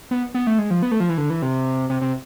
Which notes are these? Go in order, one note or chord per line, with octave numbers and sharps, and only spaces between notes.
B3
B3
A3
G#3
F3
B3
A3
F3
E3
D3
E3
C3
C3
C3